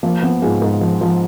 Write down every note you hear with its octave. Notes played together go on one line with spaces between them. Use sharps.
F3 A#3
F3 B3
G#2 F4 G#4
G#2
F3
F3